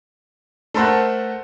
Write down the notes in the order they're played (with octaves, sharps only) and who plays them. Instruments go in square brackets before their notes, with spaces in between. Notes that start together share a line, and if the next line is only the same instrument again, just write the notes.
[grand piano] A3 A4 A#4 C5 E5 F#5